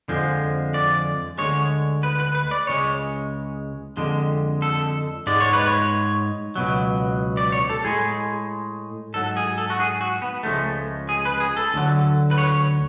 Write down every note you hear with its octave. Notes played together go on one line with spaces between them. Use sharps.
F2 D3 F3 G#3
D5
D2 D3 G#3 C#5
B4
B4
B4
D5
C#2 C#3 G#3 C#5
F2 D3 G#3
A4
G#2 G#3 D5
C#5
B4
C#5
C#2 B2 F#3
D5
C#5
A4
A2 G#3 G#4
G#2 F#3 A4
G#4
A4
F#4
G#4
F#4
B3
C#2 C#3 F3 G#3 A3
G#4
B4
G#4
A4
D2 D3 F#3
B4
C#5